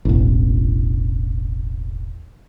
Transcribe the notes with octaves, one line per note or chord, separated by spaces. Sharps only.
E1 A1